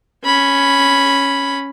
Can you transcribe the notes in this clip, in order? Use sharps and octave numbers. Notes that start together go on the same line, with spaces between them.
C#4 B5